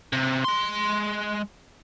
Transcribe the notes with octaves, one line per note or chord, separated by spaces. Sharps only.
C3
G#3 C6